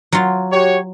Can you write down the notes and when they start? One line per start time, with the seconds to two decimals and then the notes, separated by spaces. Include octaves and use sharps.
0.12 F#3 F4
0.52 F#4 G4 C#5